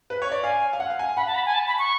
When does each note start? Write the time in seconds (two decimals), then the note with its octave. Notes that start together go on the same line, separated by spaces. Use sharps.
0.10 B4
0.22 C#5
0.32 D5
0.43 F5 G#5
0.73 F5
0.80 F#5
0.90 F5
0.99 G#5
1.17 F#5 B5
1.27 A5
1.35 B5
1.46 G#5
1.54 A5
1.67 B5
1.79 C#6